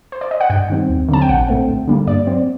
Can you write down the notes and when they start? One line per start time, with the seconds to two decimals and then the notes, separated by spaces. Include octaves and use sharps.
0.12 C5
0.21 D5
0.31 D#5
0.41 F#5
0.50 G2 G5
0.70 D#3 G3 C4
0.89 D#2
1.09 D3 F#3 C4 A5
1.22 G5
1.29 A#1 F#5
1.48 A2 A3 C4
1.67 D2
1.88 D3 G3 A#3
2.07 G2 D5
2.27 F#3 C4